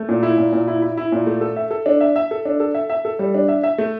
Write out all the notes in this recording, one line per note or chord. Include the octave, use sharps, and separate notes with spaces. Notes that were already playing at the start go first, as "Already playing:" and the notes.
Already playing: A3
A#2
E4
A#2
A#2
E4
E4
E4
A#2
A3
A4
E5
A4
D4
E5
E5
A4
D4
A4
E5
E5
A4
G3
D4
E5
E5
A3